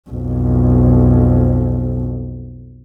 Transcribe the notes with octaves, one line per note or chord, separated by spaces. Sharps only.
B1 F2